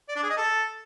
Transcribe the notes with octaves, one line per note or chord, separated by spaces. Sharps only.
D5
D4
G#4
D#5
A4